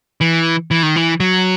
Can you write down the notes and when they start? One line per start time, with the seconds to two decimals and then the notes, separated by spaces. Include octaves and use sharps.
0.21 E3
0.71 E3
0.83 D#3
0.96 E3
1.20 F#3